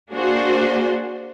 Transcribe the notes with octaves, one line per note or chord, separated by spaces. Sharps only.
A#3 D4 F#4 G#4 C5